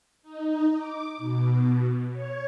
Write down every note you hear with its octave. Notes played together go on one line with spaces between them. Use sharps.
D#4
D6
B2
C#5